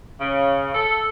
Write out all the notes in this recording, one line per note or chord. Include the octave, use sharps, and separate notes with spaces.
C#3
A4